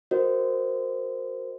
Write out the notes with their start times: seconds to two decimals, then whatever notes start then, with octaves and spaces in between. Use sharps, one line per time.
0.11 F#4 A#4 C5 D#5